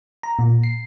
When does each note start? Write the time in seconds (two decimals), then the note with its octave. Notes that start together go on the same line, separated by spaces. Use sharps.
0.23 A#5
0.39 A#2
0.63 C7